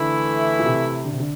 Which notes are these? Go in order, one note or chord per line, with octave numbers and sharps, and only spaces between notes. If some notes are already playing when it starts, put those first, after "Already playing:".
Already playing: D3 E3 A3 E4
A#2
C3
D3
C3
D3